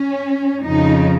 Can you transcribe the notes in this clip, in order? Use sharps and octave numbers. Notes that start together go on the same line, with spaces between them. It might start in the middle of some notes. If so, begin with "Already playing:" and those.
Already playing: C#4
F2 C#3 F3 D#4